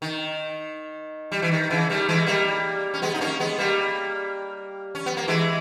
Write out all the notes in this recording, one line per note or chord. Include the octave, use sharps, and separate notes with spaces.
D#3
G3
E3
D#3
C#3 E3
D#3 G3
E3 G#3
G3 A#3
C#4
G#3 B3
D#4
A#3 C#4
G#3 B3
G3 A#3
C#4
B3
A#3
E3 G#3